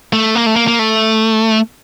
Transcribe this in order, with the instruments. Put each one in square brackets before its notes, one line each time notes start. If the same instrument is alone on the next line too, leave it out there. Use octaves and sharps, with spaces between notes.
[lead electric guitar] A3
A#3
A3
A#3
A#3
A3